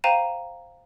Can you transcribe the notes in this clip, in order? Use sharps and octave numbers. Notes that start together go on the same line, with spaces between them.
C5 F5 G5 A#5 D#7 E7